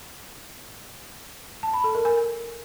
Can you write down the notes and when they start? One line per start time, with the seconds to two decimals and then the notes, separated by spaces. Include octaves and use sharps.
1.63 A5
1.74 B5
1.84 A4
1.95 A#4
2.05 G#5